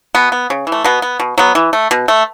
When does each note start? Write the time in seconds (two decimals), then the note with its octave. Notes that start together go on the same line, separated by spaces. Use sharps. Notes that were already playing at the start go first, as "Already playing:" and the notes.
0.15 B2 B3
0.32 B3
0.50 C#3
0.67 E3
0.72 A3
0.84 B2 B3
1.02 B3
1.20 B2
1.38 F#3 B3
1.55 E3
1.73 A3
1.91 B2
2.08 A3